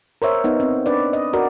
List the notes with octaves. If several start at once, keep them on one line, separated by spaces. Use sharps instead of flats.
A#4 C5 C#5 E5
B3 D#4
C4
D4 B4 D5
D#5
F#4 A#4 D5